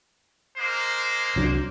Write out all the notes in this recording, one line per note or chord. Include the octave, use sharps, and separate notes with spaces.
G#3 A#3 C5
C2 F#3 D4